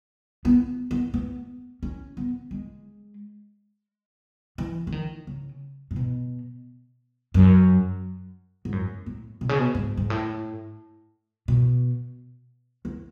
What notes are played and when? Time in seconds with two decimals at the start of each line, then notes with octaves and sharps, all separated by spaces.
0.45 B3
0.91 B3
1.14 B3
1.83 C#4
2.17 B3
2.51 G#3
4.58 E3
4.87 E3
4.92 D#3
5.27 C#3
5.91 A2
5.96 B2
7.34 F#2
8.65 G#2
8.72 F#2
9.06 A2
9.41 B2
9.49 C#3
9.59 B2
9.75 G#2
9.97 G#2
10.10 A2
11.48 B2
12.85 E2